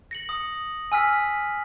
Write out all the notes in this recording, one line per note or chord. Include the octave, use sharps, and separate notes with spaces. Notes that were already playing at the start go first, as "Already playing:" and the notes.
A#6 C#7 F#7
D#6
G#5 E6 F6 B6